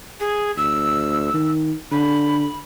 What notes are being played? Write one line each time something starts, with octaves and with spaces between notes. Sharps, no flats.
G#4
D2 E6
D#3
D3 B5